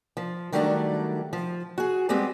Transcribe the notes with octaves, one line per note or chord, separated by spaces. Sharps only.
F3
D#3 F#3 G3 A3 C#4 D4
F3
F#4 G#4
G3 G#3 B3 C4 G4